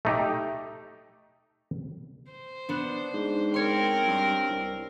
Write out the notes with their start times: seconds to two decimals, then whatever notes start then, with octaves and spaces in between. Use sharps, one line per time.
0.05 A3 D#4 G4
2.32 C5
2.69 B3 D4
3.13 G#2
3.54 C4 A#4 C#5 C6
4.07 G2
4.49 C2